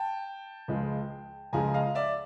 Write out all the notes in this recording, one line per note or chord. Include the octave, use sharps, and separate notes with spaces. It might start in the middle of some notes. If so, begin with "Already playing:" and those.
Already playing: G5 A5
C#2 C#3 F3 G#3
C#2 C#3 F3 G#3 G#5 A#5
D#5 F5
D5 E5